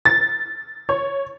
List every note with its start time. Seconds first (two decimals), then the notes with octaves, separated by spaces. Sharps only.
0.05 A6
0.89 C#5